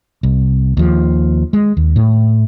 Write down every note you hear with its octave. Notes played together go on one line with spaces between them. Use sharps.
C2
D#2 F3
G#3
D#2
A2